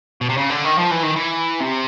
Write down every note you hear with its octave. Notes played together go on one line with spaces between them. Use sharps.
B2
C3
C#3
D3
D#3
F3
E3
D#3
E3
C3